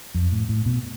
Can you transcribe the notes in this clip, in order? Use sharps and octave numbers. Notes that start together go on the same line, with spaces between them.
F2
A2
A2
B2